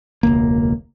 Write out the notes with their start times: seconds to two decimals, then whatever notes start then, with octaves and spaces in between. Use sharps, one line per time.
0.23 E1 C#2 A#3